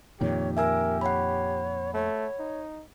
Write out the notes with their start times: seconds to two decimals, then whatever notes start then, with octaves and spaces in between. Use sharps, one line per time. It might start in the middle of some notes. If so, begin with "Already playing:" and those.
0.21 F2 A#2 D#3 G4 C#5
0.57 A#4 E5 G#5 E6
1.01 C#5 F#5 B5
1.94 A3 C#5
2.39 D#4